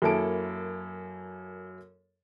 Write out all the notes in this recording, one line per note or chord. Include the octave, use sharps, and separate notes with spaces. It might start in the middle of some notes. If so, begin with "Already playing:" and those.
F#2 A#3 E4 A4 A5 D7